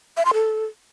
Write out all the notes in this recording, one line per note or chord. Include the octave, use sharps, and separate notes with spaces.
E5
C6
A4